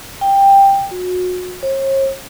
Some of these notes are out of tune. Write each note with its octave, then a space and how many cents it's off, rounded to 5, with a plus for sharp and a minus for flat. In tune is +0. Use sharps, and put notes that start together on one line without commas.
G5 +10
F#4 -30
C#5 -45